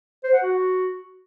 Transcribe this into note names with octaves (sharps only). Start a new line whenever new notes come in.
C5
F#5
F#4